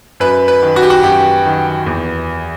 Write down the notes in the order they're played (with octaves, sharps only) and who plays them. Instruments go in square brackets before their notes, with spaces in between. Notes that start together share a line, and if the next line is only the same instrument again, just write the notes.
[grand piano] F#2 B4
B4
D#3
F#4
G4
F#4
F#2 G4
D#3
E2